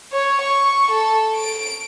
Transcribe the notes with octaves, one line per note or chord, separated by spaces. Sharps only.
C#5
C#6
A4
D7